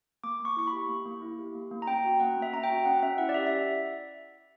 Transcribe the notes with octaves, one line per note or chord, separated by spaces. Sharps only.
A#3 D6
A#3 C#6
E4 C#6
B5
G4
A#3
A#3
E4
G4
A#3
A#3
A#5
C#4 G5
F#4
A#3 F#5
A#3
E5
C#4 A#5
G5
F#4
C#4 F#5
C#4 E5
E4 F#5
D5
G4 E5
E5